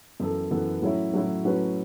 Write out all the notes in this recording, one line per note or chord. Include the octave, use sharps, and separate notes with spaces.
F#2 E3 B3 A4
F#2 E3 B3 A4
A2 F#3 C#4 E4
A2 F#3 C#4 E4
A2 F#3 C#4 F#4 B4